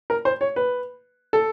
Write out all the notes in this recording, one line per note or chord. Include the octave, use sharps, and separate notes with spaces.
A#4
C5
C#5
B4
A4